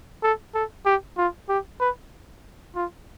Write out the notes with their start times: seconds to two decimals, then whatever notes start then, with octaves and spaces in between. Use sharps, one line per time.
0.23 A4
0.55 A4
0.86 G4
1.17 F4
1.49 G4
1.80 B4
2.75 F4